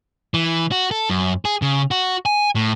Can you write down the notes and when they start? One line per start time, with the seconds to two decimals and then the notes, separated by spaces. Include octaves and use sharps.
0.34 E3
0.71 F#4
0.91 A4
1.10 F#2
1.45 G#4
1.62 C#3
1.91 F#4
2.26 G#5
2.55 A2